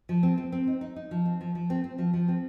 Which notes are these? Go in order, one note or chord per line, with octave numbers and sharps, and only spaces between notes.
F3
C4
C4
C4
D#4
D#4
D#4
F3
C4
F3
F3
C4
C4
F3
F3
C4